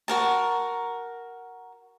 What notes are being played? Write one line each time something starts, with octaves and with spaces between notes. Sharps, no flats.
F#4 A#4 A5